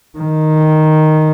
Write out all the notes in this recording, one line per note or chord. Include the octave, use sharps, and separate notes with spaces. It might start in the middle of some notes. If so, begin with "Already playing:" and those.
D#3